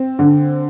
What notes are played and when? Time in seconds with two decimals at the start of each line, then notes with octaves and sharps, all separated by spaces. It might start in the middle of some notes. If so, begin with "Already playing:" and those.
Already playing: C4
0.19 D3